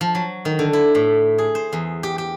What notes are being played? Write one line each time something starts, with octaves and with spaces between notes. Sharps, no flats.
F3
F#3
D#3
D3
E4
A2
G#4
C5
E2
G4
G4